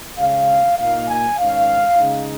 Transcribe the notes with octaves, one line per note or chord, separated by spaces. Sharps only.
C#3 G#3 C#4 F5
A#2 A#3 D#4 F5
G#5
G#2 D#3 C#4 F5
C#3 G#3 D#4